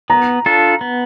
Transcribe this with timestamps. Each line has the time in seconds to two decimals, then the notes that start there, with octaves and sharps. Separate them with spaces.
0.10 B3 A#5
0.46 D4 F4 A4
0.81 B3